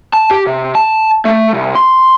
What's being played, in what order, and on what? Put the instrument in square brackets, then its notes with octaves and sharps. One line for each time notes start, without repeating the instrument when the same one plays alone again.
[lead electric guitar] A5
G4
C3
A5
A3
C2
C6